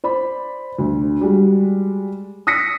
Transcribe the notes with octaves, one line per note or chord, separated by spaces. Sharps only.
C5 D5 B5
D2
G3 G#3 F#4
D#6 E6 A#6 B6 C#7